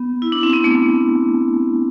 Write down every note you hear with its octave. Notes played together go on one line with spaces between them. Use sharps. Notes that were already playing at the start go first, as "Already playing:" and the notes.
Already playing: B3
E4
D4
C4
B3
A3